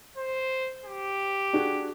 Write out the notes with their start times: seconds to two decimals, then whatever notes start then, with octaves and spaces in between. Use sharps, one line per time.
0.17 C5
0.85 G4
1.53 D4 F#4 G#4